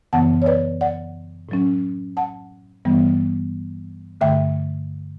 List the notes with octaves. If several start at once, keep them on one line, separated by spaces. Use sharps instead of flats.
F#2 C#3 E3 B3 F#5 A5
C#5
B4 D5
D5 F#5
A2 F#3 C#4
F#5 A5
G2 E3 G3 B3
G2 D3 A3 E5 G5